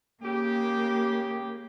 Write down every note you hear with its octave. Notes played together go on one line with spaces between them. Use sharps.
C#3 A#3 G4